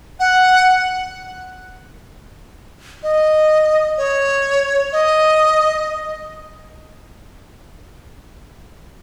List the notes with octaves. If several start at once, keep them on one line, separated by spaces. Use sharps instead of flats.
F#5
D#5
C#5
D#5